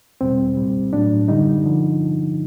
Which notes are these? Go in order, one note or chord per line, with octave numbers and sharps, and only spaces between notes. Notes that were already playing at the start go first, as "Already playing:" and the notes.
E2 B2 G3 C4
C2 A#2 G3
A2 F#3 D4
F#2 D3 G3 D#4
D3 F3